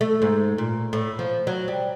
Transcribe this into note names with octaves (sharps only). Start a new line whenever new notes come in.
A3
G#2
A#2
A2
F3
F#3
G3